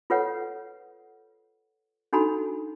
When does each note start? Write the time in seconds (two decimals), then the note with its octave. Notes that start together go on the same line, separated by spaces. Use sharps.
0.10 F4 A4 B4 C#5 F#5
2.13 D4 D#4 F#4 A4 A#5 B5